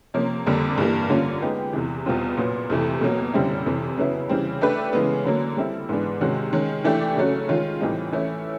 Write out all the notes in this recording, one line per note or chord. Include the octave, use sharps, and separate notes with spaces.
C3 F3 A#3 C#4
F2 D3 G3 A#3 D4
G2 E3 G3 A#3
D3 G3 A#3 C#4 F4
G#3 B3 D#4 G4
E2 C3 E3
E2 B2 G3 C4 F4
A#2 F#3 B3
F2 C3 E3 A3
B2 F#3 A#3
F#2 D3 G3 C4 E4
F2 C3 E3
C#3 F#3 B3 E4
C#3 E3 G3 C4
A3 D4 G4 B4 E5
C#3 E3 G#3 B3
D3 F#3 A#3
G3 C4 E4 A4
G#2 E3 G#3 B3 D4
C3 D#3 G#3 C#4 F#4
D#3 G#3 C#4
E3 A3 D4 G4
C#3 F#3 A3 C#4 F#4
D#3 G#3 C#4 F4
A2 E3 G3 C4 D#4
E3 A3 C#4 E4